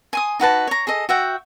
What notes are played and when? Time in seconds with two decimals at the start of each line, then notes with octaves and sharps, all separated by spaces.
0.13 G#5 C6 D#6
0.40 D#4 F#4 B4 A5
0.67 C#5 A#5
0.87 G#4 A4 D#5
1.09 F#4 E5 F#5 G5